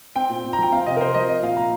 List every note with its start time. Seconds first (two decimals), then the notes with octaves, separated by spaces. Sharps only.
0.16 C4 G5
0.30 A#2
0.44 A#2
0.53 A#5
0.58 F3 G5
0.72 C4 F5
0.86 C3 D#5
0.97 A#4
1.00 C3 C5
1.14 F3 D#5
1.28 C4 D#5
1.43 A#2 F5
1.56 A#2 A#5